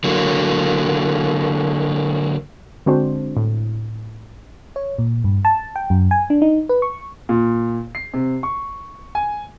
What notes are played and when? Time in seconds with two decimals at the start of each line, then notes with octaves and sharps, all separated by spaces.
0.04 D3 F#3 A#3
2.86 D3 G#3 C4 D4 F#4 C5
3.37 A2
4.76 C#5
4.99 A#2
5.24 G2
5.45 A5
5.76 G5
5.90 F#2
6.11 G#5
6.30 D4
6.42 D#4
6.69 B4
6.82 C#6
7.29 A#2
7.95 C7
8.14 C3
8.43 C#6
9.15 G#5